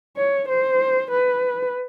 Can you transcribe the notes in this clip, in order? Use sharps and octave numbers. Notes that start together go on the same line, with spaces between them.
C#5
C5
B4